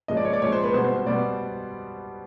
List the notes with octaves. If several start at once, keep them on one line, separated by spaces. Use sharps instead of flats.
A#2 F3 G#3 C#4 D#5
D5
C#5
D5
A#2 F3 G#3 C#4 C#5
C5
B4
B2 G3 B3 C5
C5
C5
B2 G3 B3 D5